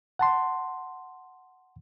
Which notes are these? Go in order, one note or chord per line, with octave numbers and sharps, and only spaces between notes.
F#5 A5 C6